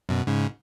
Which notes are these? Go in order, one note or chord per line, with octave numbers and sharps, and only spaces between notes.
F#2 B2
G#2 C#3